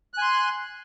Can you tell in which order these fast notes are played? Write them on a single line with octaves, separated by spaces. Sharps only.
F#6 G#5 C6